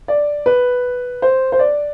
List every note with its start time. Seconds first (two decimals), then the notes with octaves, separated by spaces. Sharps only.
0.08 D5
0.46 B4
1.22 C5
1.52 C5
1.59 D5